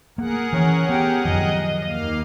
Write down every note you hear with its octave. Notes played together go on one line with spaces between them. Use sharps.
A#3 G#4 A#4 F#5
E3 C#4
B3 G4
F#2 D#3 F3 D#5
D#2 A#3 F5